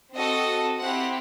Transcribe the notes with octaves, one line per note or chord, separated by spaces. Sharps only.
C4 F#4 A4 D#5
C4 E4 G4 F#5